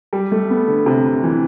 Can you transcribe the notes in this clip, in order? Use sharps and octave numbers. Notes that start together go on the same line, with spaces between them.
G3
A3
B3
D3
C3
E3